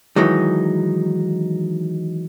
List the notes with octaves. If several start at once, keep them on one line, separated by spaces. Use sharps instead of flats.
D#3 E3 F#3 G#3 D#4